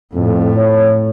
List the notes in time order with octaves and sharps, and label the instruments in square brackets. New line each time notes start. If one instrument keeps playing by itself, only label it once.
[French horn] F2 [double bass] A2
[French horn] C#5